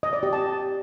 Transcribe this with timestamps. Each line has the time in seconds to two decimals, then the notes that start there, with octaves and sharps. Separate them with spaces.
0.03 D#5
0.13 D5
0.23 G4
0.33 A5